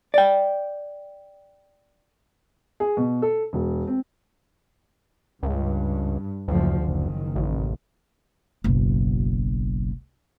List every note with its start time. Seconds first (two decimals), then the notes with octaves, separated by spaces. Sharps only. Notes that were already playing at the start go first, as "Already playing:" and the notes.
0.14 D5 G5
2.80 G#4
2.97 B2
3.22 A4
3.53 E1
3.87 C4
5.43 C#2 G2
6.48 F#1 D2 F3
6.83 F#1 D#3
7.36 A1
8.64 F#1 B1